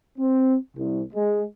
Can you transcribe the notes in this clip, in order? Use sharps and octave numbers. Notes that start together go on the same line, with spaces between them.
C4
C2
G#3